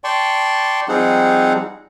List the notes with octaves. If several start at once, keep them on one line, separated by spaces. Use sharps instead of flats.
D5 G5 A5 C6 C#6
F3 G3 C4 D#4 G#4 F#5